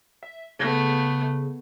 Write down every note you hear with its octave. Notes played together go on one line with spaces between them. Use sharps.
E5
C#3 A3 B3